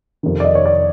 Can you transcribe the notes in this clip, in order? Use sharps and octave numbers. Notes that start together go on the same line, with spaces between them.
F2 C3 D#3
D5
D#5
C#5
D5